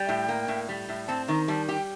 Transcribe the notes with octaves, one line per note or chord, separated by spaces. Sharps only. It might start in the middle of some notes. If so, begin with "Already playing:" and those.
Already playing: G3 G5
A2
A#3
A2
G3
A2
C4 A5
D#3 A#5
G3 A5
G4 G5